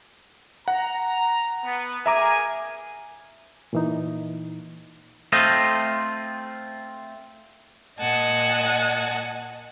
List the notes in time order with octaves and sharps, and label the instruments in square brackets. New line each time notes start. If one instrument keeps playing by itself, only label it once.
[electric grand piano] F#5 [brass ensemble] A#5
[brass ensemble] B3
[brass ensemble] G#4 A#4 G#5 [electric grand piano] E5 A#5 D6
[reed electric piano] A#2 E3 D#4
[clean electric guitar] A3 C4 F4 C5 D#5
[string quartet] A#2 D#5 F#5 G#5 A5